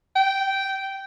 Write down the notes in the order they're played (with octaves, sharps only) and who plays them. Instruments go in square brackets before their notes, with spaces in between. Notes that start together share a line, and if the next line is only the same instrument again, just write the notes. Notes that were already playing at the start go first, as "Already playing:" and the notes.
[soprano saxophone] G5